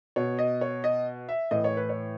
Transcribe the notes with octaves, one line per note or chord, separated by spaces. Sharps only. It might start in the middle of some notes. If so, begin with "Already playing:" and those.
B2 C#5
D#5
C#5
D#5
E5
A2 E3 D#5
C#5
B4
C#5